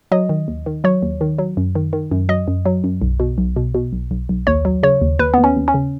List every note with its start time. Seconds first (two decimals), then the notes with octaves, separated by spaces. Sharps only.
0.12 F#3 D#5
0.29 D#3
0.48 D#2
0.66 D#3
0.84 F#3 C#5
1.02 D#2
1.21 D#3
1.38 F#3
1.57 F#2
1.75 D#3
1.93 D#3
2.11 F#2
2.29 F#3 D#5
2.48 F#2
2.65 F#3
2.84 F#2
3.01 B1
3.20 B2
3.38 B1
3.56 B2
3.75 B2
3.93 B1
4.11 B1
4.29 B1
4.47 D#2 C#5
4.65 F#3
4.83 C#3 C#5
5.01 D#2
5.19 D#2 B4
5.34 D#2 B3
5.44 C#4
5.56 D#2
5.68 C#4
5.74 C#3